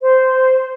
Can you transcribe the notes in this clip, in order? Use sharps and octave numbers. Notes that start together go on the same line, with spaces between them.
C5